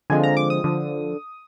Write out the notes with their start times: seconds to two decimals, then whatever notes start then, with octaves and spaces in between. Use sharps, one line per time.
0.10 D3 F3 G#3 C4 F4 G#5
0.23 A#5
0.37 D6
0.50 D#6
0.64 D3 F3